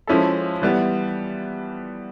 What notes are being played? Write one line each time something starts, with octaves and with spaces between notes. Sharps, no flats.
F3 G#3 C#4 E4 A4
E3 G3 B3